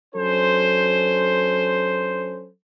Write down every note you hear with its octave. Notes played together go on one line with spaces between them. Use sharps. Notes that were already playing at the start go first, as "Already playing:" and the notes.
F#3 C#4 D4 A4 C5